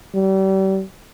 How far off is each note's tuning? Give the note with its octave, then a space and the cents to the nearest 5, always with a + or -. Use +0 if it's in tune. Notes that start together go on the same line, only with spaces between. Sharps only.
G3 -35